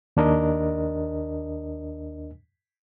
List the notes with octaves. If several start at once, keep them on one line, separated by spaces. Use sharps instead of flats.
D#2 D4 A#4 D#5